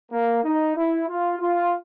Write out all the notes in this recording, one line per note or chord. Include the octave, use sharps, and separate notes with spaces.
A#3
D#4
E4
F4
F4